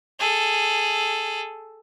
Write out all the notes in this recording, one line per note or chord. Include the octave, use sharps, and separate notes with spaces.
G#4 A4